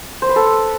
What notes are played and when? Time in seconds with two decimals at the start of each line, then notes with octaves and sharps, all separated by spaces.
0.22 C5
0.29 B4
0.36 A4